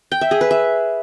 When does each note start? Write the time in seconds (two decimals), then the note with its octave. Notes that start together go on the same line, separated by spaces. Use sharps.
0.12 G5
0.21 E5
0.31 G#4
0.41 B4
0.51 E5